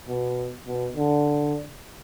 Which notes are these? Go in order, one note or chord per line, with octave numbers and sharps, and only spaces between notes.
B2
B2
D3